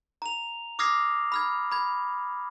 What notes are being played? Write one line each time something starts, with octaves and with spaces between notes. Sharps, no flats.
A#5 F7
D6 D#6 F6 G#6 A#6 C7
B5 F6 G#6
B5 G#6